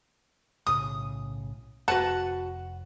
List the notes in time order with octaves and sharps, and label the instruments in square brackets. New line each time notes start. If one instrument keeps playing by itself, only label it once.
[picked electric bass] B1 A2 C#3 [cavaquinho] D#6
[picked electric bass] F1 [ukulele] F#4 B4 A5 [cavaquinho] F#5